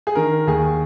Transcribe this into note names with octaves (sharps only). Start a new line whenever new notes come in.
G#4
D#3 A#4
D#2 G#4